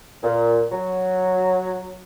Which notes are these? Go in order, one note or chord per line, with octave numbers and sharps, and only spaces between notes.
A#2
F#3